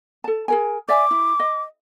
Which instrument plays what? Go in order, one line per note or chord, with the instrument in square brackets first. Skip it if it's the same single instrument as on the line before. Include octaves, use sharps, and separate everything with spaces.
[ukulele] A4 A5
G#4 A#4 G#5
[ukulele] D5 E5 G#5 [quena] D6
[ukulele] E4
D#5